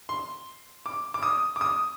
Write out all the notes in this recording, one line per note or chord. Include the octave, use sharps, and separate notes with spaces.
C6
D6
D6
D#6
D6
D#6